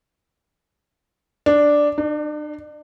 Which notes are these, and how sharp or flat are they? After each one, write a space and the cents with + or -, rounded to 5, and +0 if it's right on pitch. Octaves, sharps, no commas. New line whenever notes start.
D4 +0
D4 +40